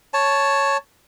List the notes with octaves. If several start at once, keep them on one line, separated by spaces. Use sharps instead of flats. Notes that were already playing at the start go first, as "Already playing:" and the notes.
C#5 A5